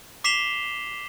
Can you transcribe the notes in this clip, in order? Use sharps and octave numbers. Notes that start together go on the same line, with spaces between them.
D6 B6 C7 E7 F7 G7